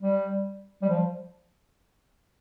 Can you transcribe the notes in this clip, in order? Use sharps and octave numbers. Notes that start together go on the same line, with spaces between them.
G3
G3
F3